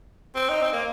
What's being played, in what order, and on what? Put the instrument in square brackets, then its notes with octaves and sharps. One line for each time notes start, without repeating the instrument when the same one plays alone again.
[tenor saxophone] C4
D#4
C4
A#3